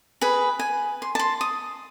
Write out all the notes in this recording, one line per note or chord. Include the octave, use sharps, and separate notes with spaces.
G#4 B4
G#5
C6
A5 C6
D#6